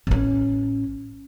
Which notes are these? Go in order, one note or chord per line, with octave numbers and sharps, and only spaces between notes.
A1 C#4